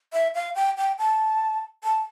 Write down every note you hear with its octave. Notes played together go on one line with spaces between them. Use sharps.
E5
F5
G5
G5
A5
A5